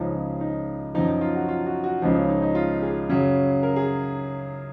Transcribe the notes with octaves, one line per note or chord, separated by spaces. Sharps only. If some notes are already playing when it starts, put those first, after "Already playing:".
Already playing: C#2 C#3 F3 D#4
C#4
D#4
F#2 F3 D#4
D#4
F4
F#4
F4
F#4
F#4
C#2 C#3 F3 D#4
C#4
D#4
D#4
F4
G#4
F#2 C#3 F#3
A#4
G#4